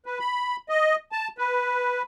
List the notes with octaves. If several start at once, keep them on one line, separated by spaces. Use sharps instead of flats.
B4
B5
D#5
A5
B4